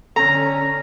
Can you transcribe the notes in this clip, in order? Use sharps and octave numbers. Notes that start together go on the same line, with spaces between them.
D3 C#4 A4 A#5